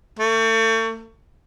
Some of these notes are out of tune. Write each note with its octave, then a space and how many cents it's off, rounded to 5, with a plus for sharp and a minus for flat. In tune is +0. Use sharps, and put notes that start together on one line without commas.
A3 +35